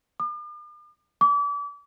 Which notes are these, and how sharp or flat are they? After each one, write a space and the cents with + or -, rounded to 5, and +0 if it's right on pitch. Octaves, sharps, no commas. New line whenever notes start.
D6 +45
D6 -35